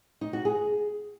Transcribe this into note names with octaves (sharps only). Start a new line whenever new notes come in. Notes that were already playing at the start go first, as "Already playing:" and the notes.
D#4
F#4
G#4